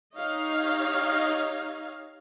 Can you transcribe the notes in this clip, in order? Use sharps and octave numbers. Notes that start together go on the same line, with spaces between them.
D#4 G4 C#5 D#5 F5